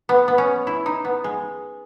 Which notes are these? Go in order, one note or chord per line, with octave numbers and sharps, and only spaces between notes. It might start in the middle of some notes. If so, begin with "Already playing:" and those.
B3
B3
C#4
E4
D#4
B3
G#3